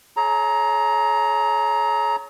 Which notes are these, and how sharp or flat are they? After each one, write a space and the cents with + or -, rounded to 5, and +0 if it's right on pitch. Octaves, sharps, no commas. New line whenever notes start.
G#4 +45 C#5 +0 A#5 +5